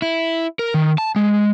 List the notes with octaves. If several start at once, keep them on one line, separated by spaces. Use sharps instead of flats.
E4
A#4
D#3
A5
G#3